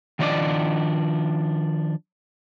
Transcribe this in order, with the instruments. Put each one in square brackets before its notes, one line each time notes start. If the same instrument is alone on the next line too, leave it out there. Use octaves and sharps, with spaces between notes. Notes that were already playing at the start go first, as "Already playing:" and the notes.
[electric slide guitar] D#3 F3 D4 A#4 D5 D#5